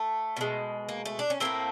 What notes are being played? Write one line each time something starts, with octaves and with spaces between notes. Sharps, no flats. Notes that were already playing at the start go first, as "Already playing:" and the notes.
Already playing: A3
B2 G#3
A#3
A3
D4
C#4
A2 F3 A3 A#3 C4